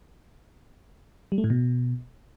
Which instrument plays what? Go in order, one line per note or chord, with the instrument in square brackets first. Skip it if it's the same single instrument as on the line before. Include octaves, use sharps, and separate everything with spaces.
[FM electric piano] G3
A3
A2
B2